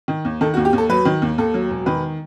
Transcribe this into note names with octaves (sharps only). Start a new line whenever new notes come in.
D#3
D#2
D#3 A4
F#4
D#2
G4
D#2
A4
F#3 B4
D#3
D#2
D#2 A4
F#3
E1
D#3 B4